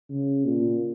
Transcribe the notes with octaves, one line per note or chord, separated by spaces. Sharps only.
C#3
A#2